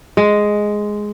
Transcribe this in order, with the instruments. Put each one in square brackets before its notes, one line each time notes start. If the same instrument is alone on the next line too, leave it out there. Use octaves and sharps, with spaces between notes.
[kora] G#3